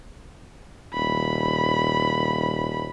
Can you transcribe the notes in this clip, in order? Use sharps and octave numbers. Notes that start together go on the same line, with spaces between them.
D#1 B5